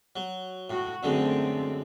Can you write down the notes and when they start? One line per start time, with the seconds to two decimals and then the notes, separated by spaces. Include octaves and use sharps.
0.16 F#3
0.70 A2 F#4
1.03 F#2 D3 G#3 A3 C4